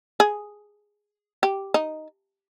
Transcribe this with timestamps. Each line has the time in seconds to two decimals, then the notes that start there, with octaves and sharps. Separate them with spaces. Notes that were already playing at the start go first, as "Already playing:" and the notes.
0.20 G#4
1.43 G4
1.74 D#4